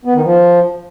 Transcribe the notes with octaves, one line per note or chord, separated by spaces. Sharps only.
B3
D#3
F3